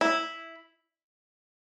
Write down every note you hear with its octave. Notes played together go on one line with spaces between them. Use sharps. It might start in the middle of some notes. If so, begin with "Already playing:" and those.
E4